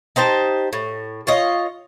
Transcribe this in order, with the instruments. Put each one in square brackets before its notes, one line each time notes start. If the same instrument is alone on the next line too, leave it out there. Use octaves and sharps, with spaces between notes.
[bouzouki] D#4 G4 C5 A5
A2
F4 C#5 D#5